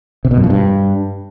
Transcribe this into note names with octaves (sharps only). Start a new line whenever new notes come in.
C3
B2
F#2
F3
G2